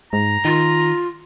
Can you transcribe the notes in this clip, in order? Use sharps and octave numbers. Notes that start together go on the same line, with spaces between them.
G#2 A#5
D#3 F4